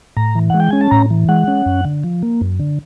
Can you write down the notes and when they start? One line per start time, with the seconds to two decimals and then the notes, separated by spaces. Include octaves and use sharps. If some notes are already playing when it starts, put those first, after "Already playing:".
0.17 A2 A#5
0.35 E3
0.50 G#3 F#5
0.60 G5
0.71 C#4 G#5
0.81 A5
0.91 A2 A#5
1.10 E3
1.29 G#3 F#5
1.48 C#4
1.66 F#2
1.84 D3
2.03 F3
2.22 A#3
2.41 F#2
2.60 D3